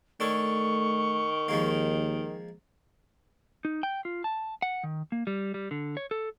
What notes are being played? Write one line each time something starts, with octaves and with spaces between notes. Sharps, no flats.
D#3 A3 D4 A4 C#5 C#6
D#2 F3 G#3 A#3
D#4
G5
F4
A5
F#5
D#3
A#3
G3
G3
D3
C#5
A4